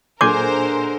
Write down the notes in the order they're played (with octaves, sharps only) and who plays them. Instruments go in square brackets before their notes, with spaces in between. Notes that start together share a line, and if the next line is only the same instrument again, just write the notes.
[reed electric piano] A#2 G#5 G6 [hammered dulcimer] D3 G#3 [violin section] A#4 C5 [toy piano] D6